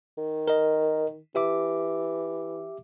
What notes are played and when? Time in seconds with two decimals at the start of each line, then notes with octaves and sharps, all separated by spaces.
0.18 D#3
0.48 A#4 D#5
1.35 E3 G4 E5 D6